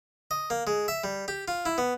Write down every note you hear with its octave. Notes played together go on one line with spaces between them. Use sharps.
D#5
A#3
G#3
E5
G3
G4
F4
E4
B3